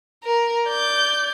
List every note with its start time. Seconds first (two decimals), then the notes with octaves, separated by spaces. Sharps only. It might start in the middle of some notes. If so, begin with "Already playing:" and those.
0.24 A#4
0.68 D5 G6